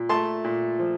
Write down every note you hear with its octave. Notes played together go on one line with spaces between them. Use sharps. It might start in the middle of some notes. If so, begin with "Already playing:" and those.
Already playing: A#2
A3 A5 C6
A#2
F3